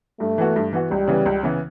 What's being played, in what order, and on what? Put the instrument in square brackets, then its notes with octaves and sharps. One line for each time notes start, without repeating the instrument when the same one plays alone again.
[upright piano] G2 [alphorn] A3
[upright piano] E3 B3 F#4
G2
E3 B3 F#4
[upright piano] C#2 [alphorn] G3
[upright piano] C#3 E3 B3
C#2
C#3 E3 B3